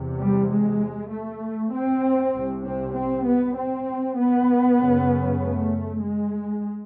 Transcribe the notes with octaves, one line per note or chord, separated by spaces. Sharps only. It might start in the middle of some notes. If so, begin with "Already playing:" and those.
Already playing: E2 C3
G3
G#3
A3
C4
C2 C3
C4
C4
B3
C4
B3
F#2 C#3
A3
G#3